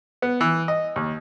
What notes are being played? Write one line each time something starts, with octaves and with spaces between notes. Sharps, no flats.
B3
E3
D#5
D#2